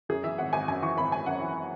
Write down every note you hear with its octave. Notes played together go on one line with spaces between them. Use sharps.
F#2 G#4
E3 E5
G#1 F#5
G#1 G#5
F#2 G#5
E3 C#6
G#1 B5
G#1 G#5
F#2 F#5
E3